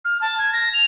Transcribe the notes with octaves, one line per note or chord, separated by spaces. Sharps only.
F6
A5
G#6
A#6
F7